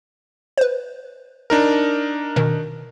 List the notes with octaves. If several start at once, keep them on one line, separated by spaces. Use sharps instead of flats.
B4 C5
D4 D#4 A#4
B2 D#3